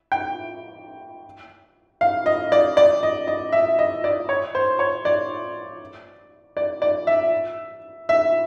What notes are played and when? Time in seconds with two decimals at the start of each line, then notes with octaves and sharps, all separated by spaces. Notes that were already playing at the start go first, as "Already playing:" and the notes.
0.12 G5
2.01 F5
2.26 D#5
2.52 D5
2.77 D5
3.03 D#5
3.27 D#5
3.52 E5
3.79 D#5
4.04 D5
4.29 C#5
4.55 C5
4.79 C#5
5.05 D5
6.57 D5
6.82 D5
7.07 E5
8.09 E5